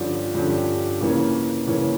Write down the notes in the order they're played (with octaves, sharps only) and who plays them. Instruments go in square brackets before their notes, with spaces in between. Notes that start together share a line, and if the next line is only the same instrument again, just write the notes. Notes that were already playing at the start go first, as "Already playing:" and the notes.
Already playing: [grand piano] G2 D3 F3 C#4 G4
G2 D3 F3 C#4 G4
C#3 E3 A#3 C#4
C#3 E3 A#3 C#4